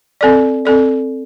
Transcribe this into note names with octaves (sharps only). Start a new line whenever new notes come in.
C4 A4 D5
C4 A4 D5